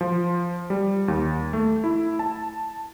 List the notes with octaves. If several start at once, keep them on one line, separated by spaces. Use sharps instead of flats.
F3
G3
D#2
A3
E4
A5